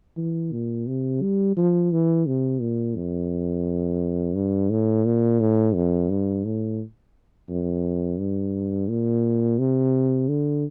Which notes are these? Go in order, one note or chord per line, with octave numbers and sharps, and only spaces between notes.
E3
A#2
C3
G3
F3
E3
C3
A#2
F2
G2
A2
A#2
A2
F2
G2
A2
F2
G2
A#2
C3
D3